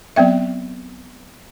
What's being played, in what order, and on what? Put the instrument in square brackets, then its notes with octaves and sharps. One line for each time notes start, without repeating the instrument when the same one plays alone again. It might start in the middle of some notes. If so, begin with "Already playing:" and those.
[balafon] F#3 B3 C4 E5